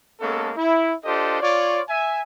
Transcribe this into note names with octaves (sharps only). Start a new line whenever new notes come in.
G#3 A#3 B3 C#4 A4
E4
D4 F4 G4 A4 C5 D#5
F4 C#5 D5
E5 G#5